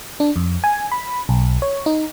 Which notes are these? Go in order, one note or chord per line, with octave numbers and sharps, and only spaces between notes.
D4
F2
G#5
B5
B1
C#5
D#4